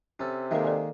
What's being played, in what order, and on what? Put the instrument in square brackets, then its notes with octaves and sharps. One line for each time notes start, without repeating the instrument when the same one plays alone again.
[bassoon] C3 [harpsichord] C#4 A4
[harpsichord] D#3 G#3 A#3 [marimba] A4 E5
[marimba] A4 D5 G#5